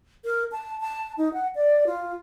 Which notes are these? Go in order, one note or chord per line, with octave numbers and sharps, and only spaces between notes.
A#4
A5
A5
D#4
F#5
D5
F4